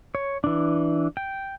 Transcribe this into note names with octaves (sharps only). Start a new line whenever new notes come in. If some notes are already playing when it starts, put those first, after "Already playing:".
C#5
E3 D4
G5